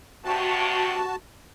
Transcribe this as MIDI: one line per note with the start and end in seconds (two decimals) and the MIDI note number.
0.24 1.02 43
0.24 1.02 48
0.24 1.16 66
0.24 1.16 81